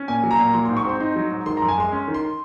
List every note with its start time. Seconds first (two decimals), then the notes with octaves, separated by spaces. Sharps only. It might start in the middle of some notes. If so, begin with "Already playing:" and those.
Already playing: C#4
0.08 A#2 G#5
0.23 F#3
0.31 A#5
0.39 A#2
0.53 F#3 C6
0.65 G#2 C6
0.77 C#6
0.84 C4
0.89 C6
1.00 D#4 C6
1.16 F#3
1.31 G#2
1.46 D#3 C6
1.57 F#2 A#5
1.68 G#5
1.77 G#3 C6
1.92 C#4
2.08 D#3
2.14 C6